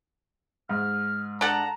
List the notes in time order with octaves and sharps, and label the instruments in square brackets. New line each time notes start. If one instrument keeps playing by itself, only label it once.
[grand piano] G#2 [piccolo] F6
[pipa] D4 A4 F#5 [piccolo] A5 [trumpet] A#5